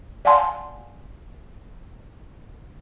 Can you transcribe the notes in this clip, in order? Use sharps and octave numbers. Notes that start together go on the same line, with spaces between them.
D5 F5 F#5 G#5 A5 C6